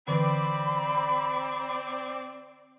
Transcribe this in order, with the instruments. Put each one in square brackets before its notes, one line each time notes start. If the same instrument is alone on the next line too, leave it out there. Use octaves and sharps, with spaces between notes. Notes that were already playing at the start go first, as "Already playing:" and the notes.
[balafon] D3 E3 B4 [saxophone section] C4 D5 [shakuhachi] B5